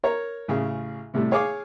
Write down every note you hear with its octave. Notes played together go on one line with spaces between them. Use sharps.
A#4 C#5 A#5
A1 C#3 G#4
A2 C3 G3 A3
G#4 C#5 F5 G#5 C#6 D6